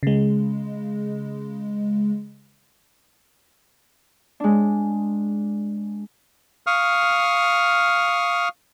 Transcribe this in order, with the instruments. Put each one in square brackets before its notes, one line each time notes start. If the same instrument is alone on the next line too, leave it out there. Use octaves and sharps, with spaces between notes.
[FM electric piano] C#3 G#3
[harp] G#3 D4
[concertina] F5 C#6 D#6 F6